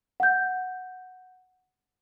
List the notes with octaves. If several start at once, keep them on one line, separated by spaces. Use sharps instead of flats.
F#5 G6